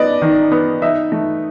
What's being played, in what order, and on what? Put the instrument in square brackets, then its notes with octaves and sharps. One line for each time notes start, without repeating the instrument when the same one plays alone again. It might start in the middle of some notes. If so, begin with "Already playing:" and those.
Already playing: [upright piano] B3 D5 D#5
D#3
B3
D#4 E5
A3